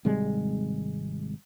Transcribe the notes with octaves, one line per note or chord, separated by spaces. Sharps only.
G#1 C3 G3 G#3